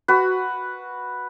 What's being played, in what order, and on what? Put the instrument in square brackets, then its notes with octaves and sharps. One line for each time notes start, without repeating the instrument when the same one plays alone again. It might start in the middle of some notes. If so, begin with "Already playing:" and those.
[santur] F#4 B4